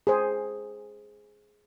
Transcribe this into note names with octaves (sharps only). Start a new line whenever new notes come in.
G#4 C5